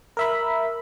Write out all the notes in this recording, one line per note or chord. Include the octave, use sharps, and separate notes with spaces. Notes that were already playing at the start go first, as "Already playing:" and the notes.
A#4 E5 B5